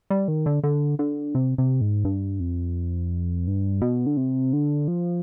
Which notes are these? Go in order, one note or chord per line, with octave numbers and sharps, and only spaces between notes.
G3
D#3
D3
D3
D3
C3
C3
G#2
G2
F2
G2
B2
D3
C3
D3
F3